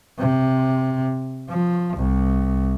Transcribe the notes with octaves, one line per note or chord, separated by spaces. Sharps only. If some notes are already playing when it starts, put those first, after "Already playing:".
C3
F3
C2